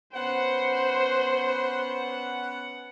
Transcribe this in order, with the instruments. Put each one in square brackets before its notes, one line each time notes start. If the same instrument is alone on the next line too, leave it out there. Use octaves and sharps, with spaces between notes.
[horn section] B3 C#4 F#5 [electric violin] C5